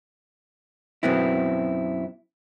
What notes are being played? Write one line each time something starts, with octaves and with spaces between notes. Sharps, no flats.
F#2 B2 B3 C4 E4